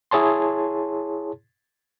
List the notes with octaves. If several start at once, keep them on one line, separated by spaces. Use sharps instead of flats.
E4 G#4 C#5 A5 C6